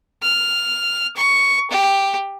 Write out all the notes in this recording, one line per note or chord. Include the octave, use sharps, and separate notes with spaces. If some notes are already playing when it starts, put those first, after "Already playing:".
F6
C#6
G4